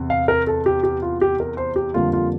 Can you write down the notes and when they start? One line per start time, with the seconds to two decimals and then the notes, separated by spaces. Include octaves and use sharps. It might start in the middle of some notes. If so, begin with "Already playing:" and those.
Already playing: E2 C3
0.10 F5
0.28 A#4
0.47 A4
0.66 G4
0.83 G4
1.02 F4
1.21 G4
1.40 A#4
1.57 C5
1.76 G4
1.94 F2 D3 G3 A#3 F4
2.13 F4